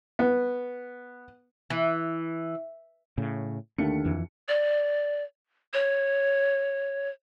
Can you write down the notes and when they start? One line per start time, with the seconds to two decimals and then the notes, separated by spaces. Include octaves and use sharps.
0.19 B3
1.70 E3
3.18 A2 C#3
3.78 D#2 D3 A3 C#7
4.04 F2 E3
4.48 D5
5.74 C#5